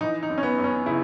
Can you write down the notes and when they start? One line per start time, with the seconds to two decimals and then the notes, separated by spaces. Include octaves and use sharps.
0.01 E3 D#4
0.23 D#4
0.30 F#2
0.38 C#4
0.43 B3
0.58 F#2
0.64 C#4
0.86 C#3 E4